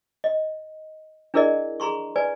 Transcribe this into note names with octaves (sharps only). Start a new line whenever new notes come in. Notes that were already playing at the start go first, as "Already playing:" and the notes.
D#5
D4 E4 G#4 A#4 D5 D#5
G#4 A#5 C6 C#6
B4 D5 G#5